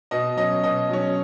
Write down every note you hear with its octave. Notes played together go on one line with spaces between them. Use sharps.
B2 D#5
F#3 C#4 D#5
B2 D#5
F#3 C#4